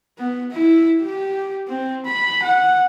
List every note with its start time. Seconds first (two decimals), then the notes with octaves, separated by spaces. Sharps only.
0.19 B3
0.51 E4
1.02 G4
1.68 C4
2.06 B5
2.43 F#5